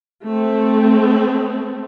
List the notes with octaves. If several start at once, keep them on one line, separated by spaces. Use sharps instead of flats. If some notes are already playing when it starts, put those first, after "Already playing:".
A3 C4